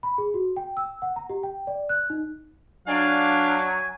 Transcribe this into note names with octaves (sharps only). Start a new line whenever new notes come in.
B5
G#4
F#4
G5
E6
F#5
A#5
G4
G5
D5
F#6
D#4
F#3 D4 F5 G#5